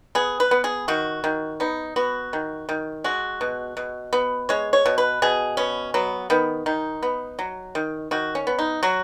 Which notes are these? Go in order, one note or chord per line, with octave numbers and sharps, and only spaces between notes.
B3 G#4
B4
B3
G#4
D#3 F#4
D#3
B3 D#4
B3 F#4
D#3
D#3
G#3 F#4
B2
B2
B3
G#3 C#5
C#5
B2
B4
B2 G#4
B3 C#4
F#3 B3
D#3 B3
D#3 D#4
B3
F#3
D#3
D#3 F#4
C#4
B3
D#4
F#3 F#4